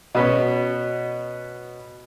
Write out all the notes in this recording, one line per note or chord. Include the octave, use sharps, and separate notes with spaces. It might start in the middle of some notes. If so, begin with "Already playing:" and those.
B2 B3 C#4